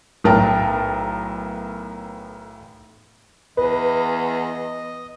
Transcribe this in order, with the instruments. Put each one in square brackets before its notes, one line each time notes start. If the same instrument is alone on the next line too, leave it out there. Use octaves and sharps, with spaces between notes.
[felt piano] B1 A2 A#4 G5 A5
[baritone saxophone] E2 [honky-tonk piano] B4 [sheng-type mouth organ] D#5